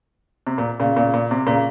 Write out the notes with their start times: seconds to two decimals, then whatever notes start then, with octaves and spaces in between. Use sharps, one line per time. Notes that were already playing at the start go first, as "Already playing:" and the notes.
0.47 C3
0.58 A#2
0.80 A#2 C#3
0.96 A#2 C#3
1.14 A#2
1.31 C3
1.47 A#2 C#3